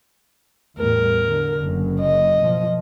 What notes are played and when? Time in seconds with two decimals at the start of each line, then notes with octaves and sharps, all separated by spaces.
0.79 E2 A2 G3 A#4
1.27 D3
1.61 F#1 F#2
2.01 D#5
2.43 B2 F3